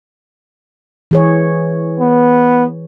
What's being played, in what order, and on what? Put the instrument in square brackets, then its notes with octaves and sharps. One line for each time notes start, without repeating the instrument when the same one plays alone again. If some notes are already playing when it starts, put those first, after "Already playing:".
[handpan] E3 G#4 C#5
[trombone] B3